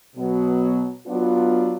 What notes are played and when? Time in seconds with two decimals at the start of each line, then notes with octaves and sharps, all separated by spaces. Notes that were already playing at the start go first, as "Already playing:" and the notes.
0.14 B2 F#3 B3
1.06 F#3 B3 D4 F4